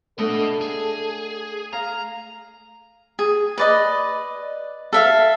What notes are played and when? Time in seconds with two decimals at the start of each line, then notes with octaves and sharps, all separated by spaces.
0.19 A3 B3 D4 A4 D#5 F#5
0.61 G#4
1.73 F5 A#5
3.19 G#4
3.58 B4 D5 D#5
4.93 A4 E5 F5